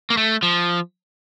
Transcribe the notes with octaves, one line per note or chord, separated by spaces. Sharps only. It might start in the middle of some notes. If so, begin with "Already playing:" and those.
A#3
A3
F3